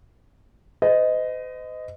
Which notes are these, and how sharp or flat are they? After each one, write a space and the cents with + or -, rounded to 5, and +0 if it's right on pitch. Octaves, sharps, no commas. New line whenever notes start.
C5 -45 D#5 +0